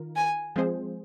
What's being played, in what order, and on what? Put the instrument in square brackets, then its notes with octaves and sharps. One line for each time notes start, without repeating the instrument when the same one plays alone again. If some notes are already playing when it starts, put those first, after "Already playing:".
Already playing: [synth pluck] D#3 F4 A#4
[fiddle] G#5
[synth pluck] F3 G#3 C4 G#4 C5